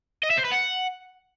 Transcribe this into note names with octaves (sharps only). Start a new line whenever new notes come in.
D#5
E5
C5
B4
F#5